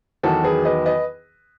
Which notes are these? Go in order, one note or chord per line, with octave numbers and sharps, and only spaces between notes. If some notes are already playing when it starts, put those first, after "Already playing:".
E2 D#3 F#3 F#4 A4
G#4 B4
B4 D#5
B4 D#5